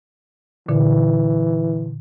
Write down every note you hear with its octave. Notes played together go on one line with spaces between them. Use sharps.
A#2 D3 E3